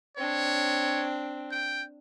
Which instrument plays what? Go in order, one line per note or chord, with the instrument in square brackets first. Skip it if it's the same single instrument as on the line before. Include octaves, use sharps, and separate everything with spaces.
[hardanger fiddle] C4 D4 [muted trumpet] C#5
[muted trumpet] G5